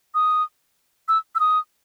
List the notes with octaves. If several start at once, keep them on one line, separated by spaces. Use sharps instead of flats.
D#6
E6
E6
D#6